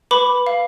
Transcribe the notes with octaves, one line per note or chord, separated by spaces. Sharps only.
B4 B5 D6
F5